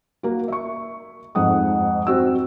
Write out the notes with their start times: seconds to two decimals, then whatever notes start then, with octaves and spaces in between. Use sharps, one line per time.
0.23 A#3 F#4
0.48 E5 C#6
1.35 F2 G#2 F#5 D#6
2.07 C4 F#4 E6